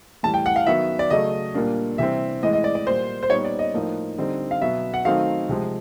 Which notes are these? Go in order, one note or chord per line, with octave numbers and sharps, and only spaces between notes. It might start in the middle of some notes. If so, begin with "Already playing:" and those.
A2 E3 G3 A5
G5
F#5
F5
D#3 F#3 B3 E5
D5
C#3 F#3 A3 D#5
A#2 G3 A#3 D4
C3 E3 G3 C4 E5
A2 E3 G#3 D#5
D#5
D5
D5
A#2 G3 A#3 C5
C5
A#2 G3 B3 D#4 C#5
D5
D#5
A2 F3 A#3 D#4
D3 G3 C4 D#4
F5
B2 F#3 B3 E5
F#5
D#3 F#3 A3 C4 D#4 F5
C3 F3 G#3